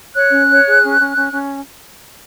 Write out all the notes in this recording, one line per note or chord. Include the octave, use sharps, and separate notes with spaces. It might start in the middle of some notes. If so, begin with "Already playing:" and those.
C#5 F#6
C#4
C#5
G#4
C#4
C#4
C#4
C#4